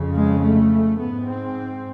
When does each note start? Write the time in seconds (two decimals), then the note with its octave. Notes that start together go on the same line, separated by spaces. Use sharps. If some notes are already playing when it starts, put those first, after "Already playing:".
Already playing: F2 C#3
0.14 G#3
0.42 A3
0.99 G#2 B3
1.28 C4